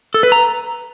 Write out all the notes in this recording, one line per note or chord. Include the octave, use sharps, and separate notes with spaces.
A4
B4
A#5